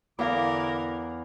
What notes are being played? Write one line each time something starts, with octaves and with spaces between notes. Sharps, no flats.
E2 D3 E4 A#4 D5 F5 B5 D6